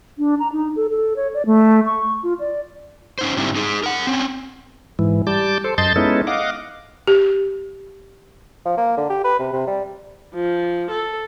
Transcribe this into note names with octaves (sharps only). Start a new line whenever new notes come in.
D4
A#5
D#4
A4
A4
C#5
D5
A3
C#6
F4
D5
C#4 D#4 C5
G#2 D3 G3 C4 E4
D#4 G#4
A#4 F#5
C4 C#4
G#2 E3
G3 A5 D6 G6
A4 C5
F#2 D#5 A5 C6 G6 A6
G#3 B3 C#4 D#4 E4 A4
D#5 F5 F#5 D6
G4
F3
A#3
D3
G4
B4
C3
C3
G3
F3
A4